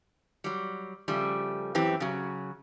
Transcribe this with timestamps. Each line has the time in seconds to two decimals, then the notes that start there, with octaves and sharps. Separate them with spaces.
0.44 F#3 G3
1.08 C#3 F3 G3 A3
1.75 F#2 E3 C4 G4
2.00 C#3 F#3